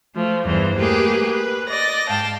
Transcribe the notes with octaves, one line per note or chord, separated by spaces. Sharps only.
F3 A3
E2 G2 E3 C5
A3 A#3 G4 G#4 B4
B4
D5 D#5 A#6
G#2 F5 G5 A5